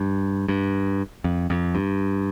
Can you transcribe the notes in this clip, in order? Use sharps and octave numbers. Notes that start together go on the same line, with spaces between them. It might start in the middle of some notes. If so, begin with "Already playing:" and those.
Already playing: G2
G2
F2
F2
G2